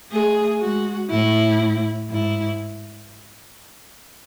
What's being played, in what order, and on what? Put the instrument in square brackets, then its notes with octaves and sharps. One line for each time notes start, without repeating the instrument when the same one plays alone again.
[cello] A3 [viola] G#4
[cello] G#3 [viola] F#4
[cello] A2 [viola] E4
[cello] G#2 [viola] E4